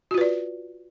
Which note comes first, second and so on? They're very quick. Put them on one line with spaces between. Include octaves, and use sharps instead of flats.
F#4 F4 B4 D5